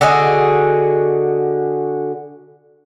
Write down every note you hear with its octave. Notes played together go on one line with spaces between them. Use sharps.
D3 F#4 G#4 D#5